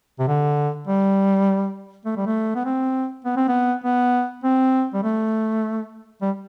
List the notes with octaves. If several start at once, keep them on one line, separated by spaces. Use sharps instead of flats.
C3
D3
G3
A3
G3
A3
B3
C4
B3
C4
B3
B3
C4
G3
A3
G3